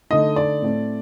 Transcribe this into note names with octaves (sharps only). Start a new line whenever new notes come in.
D3 A3 D#4 D#5
D5
A2 A3 C4